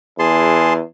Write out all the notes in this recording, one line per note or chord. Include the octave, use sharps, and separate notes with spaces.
E2 G#4 A5 C6